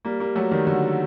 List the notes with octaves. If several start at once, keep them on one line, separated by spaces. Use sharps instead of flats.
G3 A#3
G3 A#3
F#3 A3
D#3 G3
D3 F#3